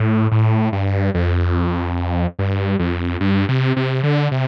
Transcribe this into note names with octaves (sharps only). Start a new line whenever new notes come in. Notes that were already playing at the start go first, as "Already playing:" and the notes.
Already playing: A2
A2
G2
F2
G2
F2
G2
C3
C3
D3
C3